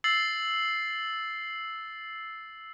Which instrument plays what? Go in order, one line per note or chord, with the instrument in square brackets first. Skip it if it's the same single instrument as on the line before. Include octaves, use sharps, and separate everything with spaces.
[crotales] E6 A6 C7 F#7